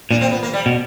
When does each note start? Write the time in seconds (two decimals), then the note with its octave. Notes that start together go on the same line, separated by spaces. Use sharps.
0.11 A#2 D4
0.21 C4
0.32 B3
0.43 A#3
0.53 G3
0.66 B2